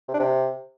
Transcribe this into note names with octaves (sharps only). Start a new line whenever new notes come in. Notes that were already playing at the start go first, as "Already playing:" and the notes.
C3
D4
C3